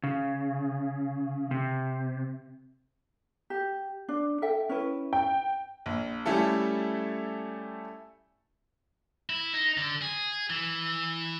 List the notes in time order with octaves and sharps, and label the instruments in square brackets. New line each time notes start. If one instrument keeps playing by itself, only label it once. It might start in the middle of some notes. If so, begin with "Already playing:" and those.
[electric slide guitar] C#3
C3
[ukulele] G4
D4
A4 E5 G5
C#4 E4 B4
[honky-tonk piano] G5
[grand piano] A#1
G3 A3 C#4 E4 A4
[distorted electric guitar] E4
D#4
D3
G#4
E3